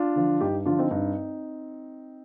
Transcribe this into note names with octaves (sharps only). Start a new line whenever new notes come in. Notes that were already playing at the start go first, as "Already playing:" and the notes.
Already playing: D4 F4
D3 F3
G2 D#4 G4
D3 F3 D4 F4
C4 D#4
G2 C4 D#4